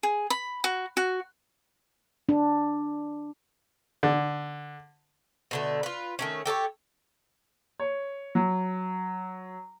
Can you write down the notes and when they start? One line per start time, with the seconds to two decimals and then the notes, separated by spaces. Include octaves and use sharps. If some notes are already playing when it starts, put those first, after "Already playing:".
0.03 G#4
0.30 B5
0.64 F#4
0.97 F#4
2.29 D4
4.03 D3
5.51 B2 D3 A3
5.83 F4 B4
6.19 D#3 A3 C#4
6.46 G4 A4 A#4 C#5
7.80 C#5
8.35 F#3